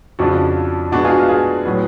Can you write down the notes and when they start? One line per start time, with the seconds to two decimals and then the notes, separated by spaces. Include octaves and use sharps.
0.19 F2 C#3 F3 D4 F#4
0.92 B2 G#3 B3 D4 F#4
1.04 F4 G#4
1.11 F#4
1.17 F4
1.29 F4 G#4
1.65 A2 F#3 B3